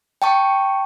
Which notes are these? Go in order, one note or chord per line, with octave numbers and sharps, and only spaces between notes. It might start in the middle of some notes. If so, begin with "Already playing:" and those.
G5 A5 C#6